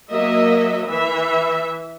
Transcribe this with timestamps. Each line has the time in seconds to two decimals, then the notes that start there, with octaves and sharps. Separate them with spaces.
0.12 F#3 A#3 D#5 E5
0.88 E3 E5